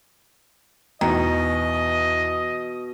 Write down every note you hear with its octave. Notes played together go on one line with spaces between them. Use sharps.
E2 B2 D#3 D#5